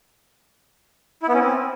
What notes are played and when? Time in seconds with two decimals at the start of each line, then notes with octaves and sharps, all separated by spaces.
1.23 E4
1.29 B3
1.35 C#4
1.40 C4